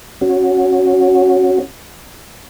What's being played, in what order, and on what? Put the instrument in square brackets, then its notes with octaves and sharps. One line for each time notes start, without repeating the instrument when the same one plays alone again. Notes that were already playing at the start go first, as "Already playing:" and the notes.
[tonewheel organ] C#4 F#4